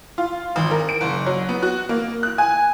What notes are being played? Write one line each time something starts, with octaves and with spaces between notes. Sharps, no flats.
F4
G#1
A#4
D7
F#1
F#3
B3
F#4
A#3
F#6
G#5